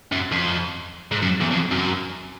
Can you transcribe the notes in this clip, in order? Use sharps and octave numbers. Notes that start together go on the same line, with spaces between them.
F#2
F2
G#2
F#2
E2
F2
F#2